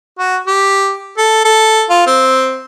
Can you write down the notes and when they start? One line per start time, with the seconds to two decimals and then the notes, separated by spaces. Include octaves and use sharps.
0.19 F#4
0.47 G4
1.18 A4
1.45 A4
1.90 F4
2.07 C4